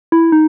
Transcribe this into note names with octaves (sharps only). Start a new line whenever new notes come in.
E4
D#4